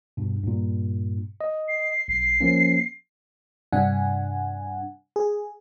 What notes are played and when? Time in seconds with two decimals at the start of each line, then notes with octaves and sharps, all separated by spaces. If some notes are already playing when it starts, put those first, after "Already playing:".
0.17 G2 B2
0.44 G2 A#2
1.41 D#5
1.68 C7
2.08 B1 C7
2.41 F3 A#3 C#4
3.72 G2 C3 D4 F#5 G#5
5.16 G#4